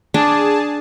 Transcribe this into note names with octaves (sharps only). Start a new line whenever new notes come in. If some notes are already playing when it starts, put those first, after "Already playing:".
D4 G#4 A5